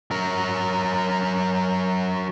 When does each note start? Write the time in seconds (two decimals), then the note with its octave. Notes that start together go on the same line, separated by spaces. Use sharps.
0.11 F#3 A#4